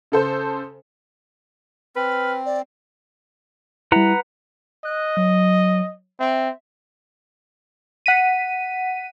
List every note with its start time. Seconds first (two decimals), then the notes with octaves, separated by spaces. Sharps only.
0.12 C#3 A4 C5
1.96 C4 B4 F6
2.46 D5
3.92 G3 E4 B4 F#5 A#5
4.85 D#5 F#6
5.17 F#3
6.20 C4 E5
8.06 F#5 B6 D#7